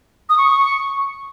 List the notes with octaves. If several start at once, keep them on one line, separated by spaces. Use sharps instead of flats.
D#6
C#6